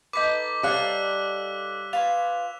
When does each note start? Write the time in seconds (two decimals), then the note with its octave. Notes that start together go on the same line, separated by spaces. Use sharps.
0.13 D#4 A4 B4 D6 B6
0.63 G3 C#5 F5 D6 E6 F#6
1.93 F4 B4 C#5 F7